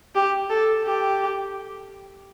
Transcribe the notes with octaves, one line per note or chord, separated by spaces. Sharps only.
G4
A4
G4